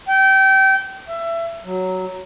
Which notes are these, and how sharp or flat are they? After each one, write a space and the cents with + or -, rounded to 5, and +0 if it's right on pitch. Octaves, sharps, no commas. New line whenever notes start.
G5 -25
E5 +25
F#3 +5